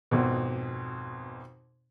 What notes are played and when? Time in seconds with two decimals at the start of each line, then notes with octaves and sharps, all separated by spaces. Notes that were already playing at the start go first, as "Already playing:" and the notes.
0.11 G#1 F2 B2